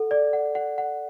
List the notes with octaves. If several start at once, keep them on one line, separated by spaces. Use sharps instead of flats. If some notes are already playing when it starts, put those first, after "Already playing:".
Already playing: A4 F#5
D5
F#5
F#5
F#5